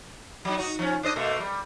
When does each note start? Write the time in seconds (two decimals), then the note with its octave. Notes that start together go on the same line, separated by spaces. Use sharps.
0.45 F#3 D#4
0.57 D#4 F#4
0.79 F3 C#4
1.03 D4 C5 D#5
1.16 B2 A3 A#3
1.40 G3